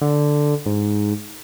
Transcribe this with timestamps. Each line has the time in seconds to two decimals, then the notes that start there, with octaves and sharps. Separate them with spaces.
0.01 D3
0.66 G#2